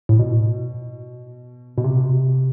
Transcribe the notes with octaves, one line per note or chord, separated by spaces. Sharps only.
A2
B2
B2
C3